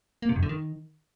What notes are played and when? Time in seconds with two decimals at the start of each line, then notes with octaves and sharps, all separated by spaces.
0.22 A#3
0.29 C3
0.36 F#2
0.43 D3
0.49 D#3